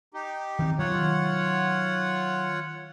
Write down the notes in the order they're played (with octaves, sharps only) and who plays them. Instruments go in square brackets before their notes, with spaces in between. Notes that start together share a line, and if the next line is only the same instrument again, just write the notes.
[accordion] D#4 G4
[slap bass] D#3 C4
[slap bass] D#3 F#3 [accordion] F4 C#5 F#5